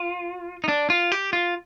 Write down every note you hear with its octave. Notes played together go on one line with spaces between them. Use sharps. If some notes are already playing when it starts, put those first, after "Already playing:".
Already playing: F4
D#4
D4
F4
G4
F4